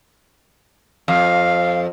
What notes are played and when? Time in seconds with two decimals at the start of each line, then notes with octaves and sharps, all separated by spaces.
1.08 F2 F5